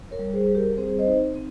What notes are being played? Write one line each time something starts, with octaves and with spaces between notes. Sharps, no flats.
A#4 C#5
G3
G#4 C5
G3
G4 A#4
C4 G#4 C5
C5 D#5
D#4
C4